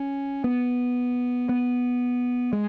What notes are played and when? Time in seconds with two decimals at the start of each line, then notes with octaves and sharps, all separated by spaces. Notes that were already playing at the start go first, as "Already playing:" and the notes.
Already playing: C#4
0.44 B3
1.49 B3
2.53 G#3